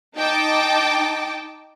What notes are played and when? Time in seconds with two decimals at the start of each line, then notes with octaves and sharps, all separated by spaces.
0.15 D#4 G5 A5 D6